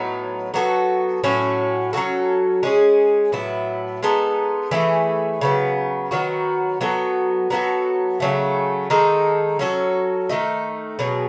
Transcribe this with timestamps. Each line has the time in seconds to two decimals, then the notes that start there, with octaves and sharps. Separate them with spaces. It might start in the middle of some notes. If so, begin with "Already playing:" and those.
Already playing: A2 F#3 B3 D#4
0.54 F#3 B3 F#4 A4
1.24 A2 F#3 C#4 F#4
1.93 F#3 C#4 F#4 A4
2.63 G#3 C#4 G#4
3.32 A2 F#3 B3 E4
4.03 G#3 B3 D#4 A4
4.71 E3 A3 E4 G#4
5.41 C#3 F#3 B3
6.11 D#3 F#3 B3 F#4
6.81 F#3 B3 F#4 A4
7.50 F#3 B3 F#4 A4
8.20 C#3 F#3 A3
8.90 D#3 G#3 D#4 A4
9.59 F#3 C#4 F#4 A4
10.29 D#3 A3 D#4
10.99 B2 F#3 C#4 G#4